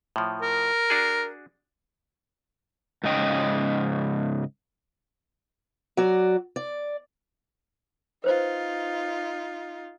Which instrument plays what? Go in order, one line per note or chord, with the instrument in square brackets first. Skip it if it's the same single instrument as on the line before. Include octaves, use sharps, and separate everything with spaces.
[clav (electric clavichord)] A2 F3
[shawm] A#4
[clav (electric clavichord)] D4 F#4 G#4
[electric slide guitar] G#2 C#3 D#5 G5
[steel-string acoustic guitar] F#3 F#4 D5
D5
[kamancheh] D#4 F4 [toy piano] B4 C5